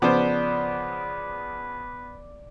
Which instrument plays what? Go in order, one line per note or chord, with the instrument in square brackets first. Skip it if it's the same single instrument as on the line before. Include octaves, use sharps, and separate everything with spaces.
[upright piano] C#3 F3 [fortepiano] B3 C5 [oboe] B4 [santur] D5